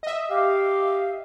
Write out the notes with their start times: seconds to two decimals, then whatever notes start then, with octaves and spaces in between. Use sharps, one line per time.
0.03 D#5 E5
0.30 G4 F5